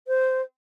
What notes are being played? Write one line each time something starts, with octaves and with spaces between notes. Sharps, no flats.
C5